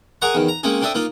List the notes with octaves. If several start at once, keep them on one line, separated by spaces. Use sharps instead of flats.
G#4 A#4 D#5 F#5 A#5 C#6
E2 D#3
A#5
G#3 A#3 C4 C#4 G#4
C4 D4 A4 E5 D#6
A#3 D#4 F4